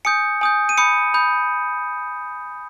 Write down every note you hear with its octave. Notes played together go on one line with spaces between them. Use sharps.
G#5 D#6 G6 C#7
G#5 D#6 G6
D#7
B5 D#6 G6 C#7
B5 D#6 G6